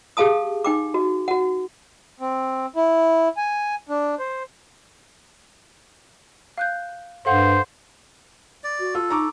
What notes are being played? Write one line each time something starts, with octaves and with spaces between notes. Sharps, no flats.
G4 G#4 F5 A5 D#6
D#4 G5 D6
F#4
F#4 F#5
C4
E4
G#5
D4
C5
F5 F#6 G6
G2 A4 C5 F5 F#5
D5
F#4
F4 A4
D#4 A#5 C#6 D6